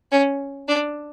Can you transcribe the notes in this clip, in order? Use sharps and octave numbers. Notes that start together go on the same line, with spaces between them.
C#4
D4